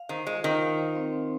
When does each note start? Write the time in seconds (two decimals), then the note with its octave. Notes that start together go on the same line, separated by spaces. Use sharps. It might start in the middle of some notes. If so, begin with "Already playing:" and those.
Already playing: F5
0.09 D#3 C5
0.26 G#3 F4
0.44 D#3 F4
0.62 F5
0.78 C5
0.95 C4
1.13 C4